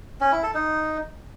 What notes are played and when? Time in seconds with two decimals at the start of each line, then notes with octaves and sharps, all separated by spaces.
0.21 C#4
0.32 E4
0.43 A4
0.54 D#4